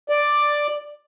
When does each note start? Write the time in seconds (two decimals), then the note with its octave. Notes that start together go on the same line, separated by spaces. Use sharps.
0.09 D5